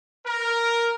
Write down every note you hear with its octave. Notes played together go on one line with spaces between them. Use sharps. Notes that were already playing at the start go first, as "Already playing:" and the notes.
A#4